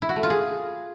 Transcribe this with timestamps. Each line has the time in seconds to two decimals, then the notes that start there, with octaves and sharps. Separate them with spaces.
0.02 E4
0.09 F#4
0.16 A3
0.23 F4
0.30 G#4